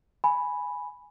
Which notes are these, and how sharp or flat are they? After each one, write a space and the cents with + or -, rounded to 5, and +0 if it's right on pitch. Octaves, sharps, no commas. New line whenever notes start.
G#5 +0 B5 +0